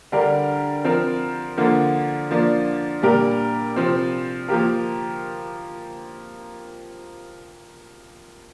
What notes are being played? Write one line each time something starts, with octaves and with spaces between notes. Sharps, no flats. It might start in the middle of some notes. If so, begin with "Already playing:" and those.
D3 G3 D4 G4 A#4
F3 C4 A#4
D3 F3 A#3
F3 A#3 D4
A#2 G3 D4 G4 A#4
C3 F3 C4
F3 A#3 G4 A#4